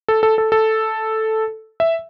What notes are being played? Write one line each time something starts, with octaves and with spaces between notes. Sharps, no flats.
A4
A4
A4
A4
E5